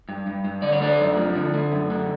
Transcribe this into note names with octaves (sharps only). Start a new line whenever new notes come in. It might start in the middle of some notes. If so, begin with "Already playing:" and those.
G2
G2
G2
D3 D5
C#5
A3 D4 D5
F#2
F3
D3
A3
F#2
D3